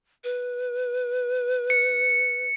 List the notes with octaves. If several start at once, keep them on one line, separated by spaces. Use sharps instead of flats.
B4
C#7